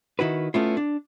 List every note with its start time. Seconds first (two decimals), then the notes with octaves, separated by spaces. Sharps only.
0.19 D#3 E4 F#4 B4
0.54 A3 B3 C#4 E4 F4
0.77 D4